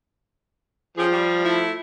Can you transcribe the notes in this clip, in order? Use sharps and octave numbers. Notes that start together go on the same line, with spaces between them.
F3 C#4 G4 G#4
G3
A3 E4